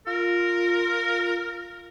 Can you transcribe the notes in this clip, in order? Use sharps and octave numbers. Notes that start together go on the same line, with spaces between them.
F4 A#4